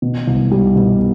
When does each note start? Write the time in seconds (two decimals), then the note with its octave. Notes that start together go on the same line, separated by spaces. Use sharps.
0.02 B2
0.27 C2
0.51 G3
0.76 B2